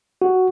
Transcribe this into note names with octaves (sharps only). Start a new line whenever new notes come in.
F#4